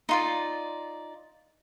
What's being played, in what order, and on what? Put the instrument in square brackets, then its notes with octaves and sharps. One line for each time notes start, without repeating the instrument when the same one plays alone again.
[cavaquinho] D#4 F4 D5